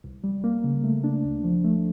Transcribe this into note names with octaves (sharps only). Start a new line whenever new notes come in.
C2
G3
A#3
C#3
A3
D4
D2
F3
A3